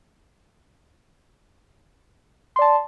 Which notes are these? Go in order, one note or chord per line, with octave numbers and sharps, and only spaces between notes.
D5 A5 C6